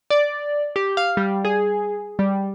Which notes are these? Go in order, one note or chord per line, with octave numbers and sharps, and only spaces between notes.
D5
G4
F5
G3
G#4
G3